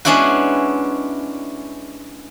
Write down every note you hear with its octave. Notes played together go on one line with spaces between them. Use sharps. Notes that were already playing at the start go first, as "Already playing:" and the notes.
G#3 B3 C#4 D4 E4 F#4